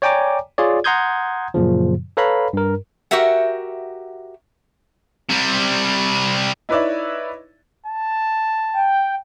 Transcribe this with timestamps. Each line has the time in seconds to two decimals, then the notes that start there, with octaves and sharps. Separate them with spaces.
0.02 C#5 D5 G5 G#5 A#5 D6
0.58 F4 G#4 C#5 D5
0.84 F#5 A#5 C6 D#6 G6 G#6
1.54 F#2 A#2 C#3 F3
2.17 A4 B4 C#5 F5 A#5 B5
2.53 G2 A#4
3.11 F#4 G4 A#4 E5 F#5
5.29 C3 G3
6.69 D#4 E4 B4 C#5 D5 E5
7.87 A5
8.73 G5